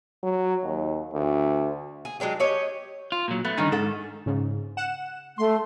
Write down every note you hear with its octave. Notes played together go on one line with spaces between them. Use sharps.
F#3
D#2
D2
G#4
F#3 G#3 D4 G4
G4 C#5 D#5
F4
A#2 F#3
A3 B3
G2 D3 D#3 C#4 D#4
G#2 D#3 A4 F#5
G#2 C#3
F#5 E7
A3 C6